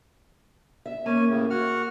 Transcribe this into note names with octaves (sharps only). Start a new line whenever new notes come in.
E5
A#3 C#4 G#5
A2 C#3
F#4 F#5 F6